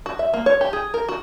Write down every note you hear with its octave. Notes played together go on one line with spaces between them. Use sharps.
F#4
E5
A#3
C#5
G4
G#4
A#4
F#4